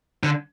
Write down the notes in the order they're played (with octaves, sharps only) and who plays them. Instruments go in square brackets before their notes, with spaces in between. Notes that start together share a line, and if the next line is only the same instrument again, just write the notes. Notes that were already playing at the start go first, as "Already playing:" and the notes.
[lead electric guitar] D3